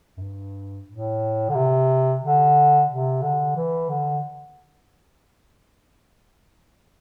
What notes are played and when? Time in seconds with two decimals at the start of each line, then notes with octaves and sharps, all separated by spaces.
0.17 F#2
0.22 G2
0.88 A2
1.49 D3
1.55 C3
2.23 D3
2.90 C3
3.22 D3
3.56 E3
3.89 D3